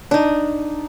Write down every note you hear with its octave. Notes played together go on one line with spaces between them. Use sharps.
D4 D#4